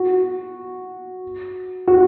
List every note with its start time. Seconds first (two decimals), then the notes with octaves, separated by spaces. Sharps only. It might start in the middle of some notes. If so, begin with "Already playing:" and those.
Already playing: F#4
1.88 F#4